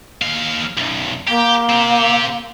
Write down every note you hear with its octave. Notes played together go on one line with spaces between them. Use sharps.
D#2 F5
B1 F#2
A#3 G4
C4 G4